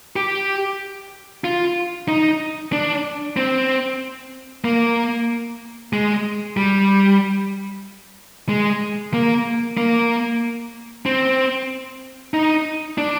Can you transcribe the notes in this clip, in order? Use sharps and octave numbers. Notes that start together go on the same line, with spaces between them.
G4
F4
D#4
D4
C4
A#3
G#3
G3
G#3
A#3
A#3
C4
D#4
D4